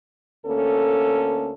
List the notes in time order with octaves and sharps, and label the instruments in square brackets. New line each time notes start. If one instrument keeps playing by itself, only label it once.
[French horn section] D2 A#3 C#4 A4